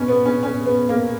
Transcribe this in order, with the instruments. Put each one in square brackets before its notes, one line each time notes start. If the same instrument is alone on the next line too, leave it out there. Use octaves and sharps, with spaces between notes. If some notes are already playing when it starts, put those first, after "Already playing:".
Already playing: [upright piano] B2 C#4
B3
C#4
C#4
B3
A#3